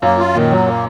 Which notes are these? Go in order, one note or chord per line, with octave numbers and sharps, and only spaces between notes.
F#2 A#3
F4
A#2 D#3
F#3
A#3